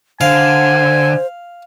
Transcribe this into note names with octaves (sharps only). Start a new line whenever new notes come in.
D3 C5 F5 G#5